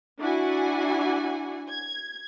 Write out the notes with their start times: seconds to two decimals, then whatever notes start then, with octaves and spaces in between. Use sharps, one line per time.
0.20 D4 E4 F#4 F#5 G#5
1.69 G#6